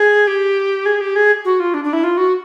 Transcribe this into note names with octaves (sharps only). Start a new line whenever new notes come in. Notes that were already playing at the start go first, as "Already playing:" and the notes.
Already playing: G#4
G4
G#4
G4
G#4
F#4
F4
D4
D4
E4
F4
F#4